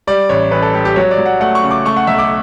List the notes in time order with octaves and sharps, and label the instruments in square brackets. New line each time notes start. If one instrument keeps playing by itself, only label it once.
[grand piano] G3 D5
A1 C#5
A1 B4
A4
G3 G4
G4
F#3 C#5
D5
F#3
F#5
A3 F#5
C#6
C#3
D6
A3 C#6
F#5
B1 E5
D6